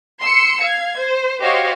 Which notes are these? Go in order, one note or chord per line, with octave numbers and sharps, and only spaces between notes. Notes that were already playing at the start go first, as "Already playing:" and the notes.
C6 E6 C7 C#7
F5 G#6
C5
F#4 G4 C5 C#5 D#5 F5